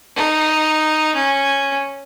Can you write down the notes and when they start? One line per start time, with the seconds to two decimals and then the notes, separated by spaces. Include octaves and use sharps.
0.16 D#4
1.15 C#4